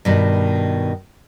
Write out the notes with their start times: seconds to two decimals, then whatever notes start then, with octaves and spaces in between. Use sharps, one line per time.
0.05 G2 B2 D#3